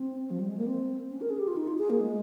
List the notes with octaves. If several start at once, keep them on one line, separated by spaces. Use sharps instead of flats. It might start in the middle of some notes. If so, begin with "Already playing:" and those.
Already playing: C4
F3
G3
G#3
A#3
C4
C#4
A#4
G#4
G4
F4
D#4
F4
G#4
A#3
G#3